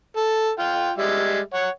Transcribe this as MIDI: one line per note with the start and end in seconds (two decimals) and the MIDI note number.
0.16 0.50 69
0.59 0.91 65
0.59 0.91 79
0.98 1.39 55
0.98 1.39 56
0.98 1.39 76
1.54 1.69 73
1.54 1.69 78